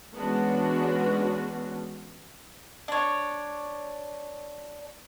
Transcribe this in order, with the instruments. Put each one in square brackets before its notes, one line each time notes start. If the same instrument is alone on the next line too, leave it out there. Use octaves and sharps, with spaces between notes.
[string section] E3 G#3 B3 C#4 D4 F#4
[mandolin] D4 C#5